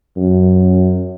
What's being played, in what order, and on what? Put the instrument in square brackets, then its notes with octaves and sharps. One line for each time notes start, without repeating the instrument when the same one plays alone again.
[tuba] F#2